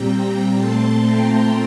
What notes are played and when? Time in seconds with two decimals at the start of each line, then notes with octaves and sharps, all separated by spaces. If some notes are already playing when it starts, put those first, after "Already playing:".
Already playing: A#2 G3 C4 G5 A#5
0.54 A#2 A3 C4 A5 C6
1.04 G5 A#5